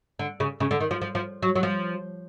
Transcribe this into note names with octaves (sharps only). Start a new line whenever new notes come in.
D3
C#3
C#3
D3
D#3
F3
F3
F3
F#3
F#3
F3